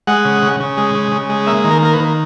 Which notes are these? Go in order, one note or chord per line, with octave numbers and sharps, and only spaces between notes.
G#3 F#5
C#3
C#3
C#3
G#3
C#3
C#3
G#3
A#3 E5
D#3
A#4
A#3 A#4
B4
D#3